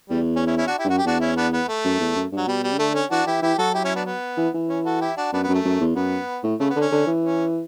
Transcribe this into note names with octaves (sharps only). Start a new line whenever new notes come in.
E2 G3
C#4
C#4 E4
C#4 E4
D4 F#4
E4 G4
G2
F#2 F#4
G4
E2 D4 F#4
C#4 E4
B3 D4
B3
A3
F#2
E2
F#2
G2 F#3
B2 G3
G3
C#3
D3 A3
C#4
E3 D4 F#4
E3 E4 G4
E3 E4 G4
F#3 F#4 A4
E4 G4
C#4 E4
B3 D4
B3
E3
E3
C#4
F#4 A4
E4 G4
D4 F#4
F#2 B3 D4
B3
F#2
A3
F#2
E2
F#2 B3
A2
C#3 A3
B3
D3
C#4
D3
E3
C#4